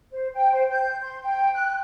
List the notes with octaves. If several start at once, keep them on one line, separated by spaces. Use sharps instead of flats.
C5
G5
C5
G6
C6
G5
F#6